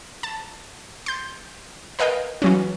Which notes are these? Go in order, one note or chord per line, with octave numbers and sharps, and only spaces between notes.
A5
C6 G6
A#4 B4 D#5 F5 G5
E3 F#3 C#4